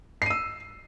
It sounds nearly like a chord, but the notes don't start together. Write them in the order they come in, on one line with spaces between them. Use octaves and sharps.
C7 D#7 E6